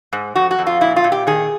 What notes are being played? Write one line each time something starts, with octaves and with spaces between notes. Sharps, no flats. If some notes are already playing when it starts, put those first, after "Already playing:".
G#2
F2 F#4
F#4
F2
F4
A#2 E4
F4
A#2
G4
D#3 G#4